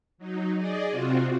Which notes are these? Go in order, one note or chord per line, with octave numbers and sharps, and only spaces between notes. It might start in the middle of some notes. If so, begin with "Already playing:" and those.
F#3 D#4
G#4 D5 D#5
C3 C4 F4 F#4